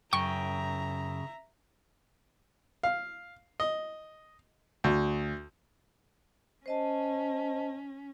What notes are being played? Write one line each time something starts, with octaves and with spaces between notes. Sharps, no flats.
F#2 C#3 E5 G5 A#5 C#6
F5
D#5
D2
C#4 C5 D#5 A5